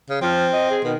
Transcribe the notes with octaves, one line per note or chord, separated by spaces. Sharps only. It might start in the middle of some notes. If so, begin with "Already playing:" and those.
C#3
F3 C4
D#5
G#4
B2 D#3